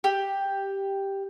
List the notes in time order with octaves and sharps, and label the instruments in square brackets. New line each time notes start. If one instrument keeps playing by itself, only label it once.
[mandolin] G4